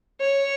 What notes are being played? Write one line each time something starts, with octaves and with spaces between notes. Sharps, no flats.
C#5